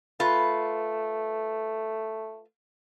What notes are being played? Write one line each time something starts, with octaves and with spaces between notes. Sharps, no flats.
A3 F4 B4